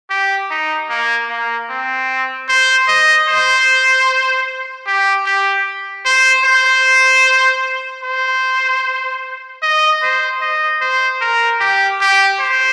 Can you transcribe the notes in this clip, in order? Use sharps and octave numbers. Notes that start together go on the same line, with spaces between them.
G4
D#4
A#3
A#3
C4
C5
D#5
C5
G4
G4
C5
C5
C5
D#5
C5
D#5
C5
A#4
G4
G4
C5